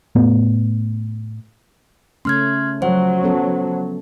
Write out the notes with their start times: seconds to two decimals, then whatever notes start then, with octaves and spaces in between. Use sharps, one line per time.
0.15 A2 A3 B3
2.25 C#3 A3 C#4 C6 F6 G#6
2.82 F3 F#3 C5 F#5
3.23 B3 C#4 A4